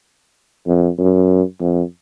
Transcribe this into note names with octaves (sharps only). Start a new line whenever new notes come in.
F2
F#2
F2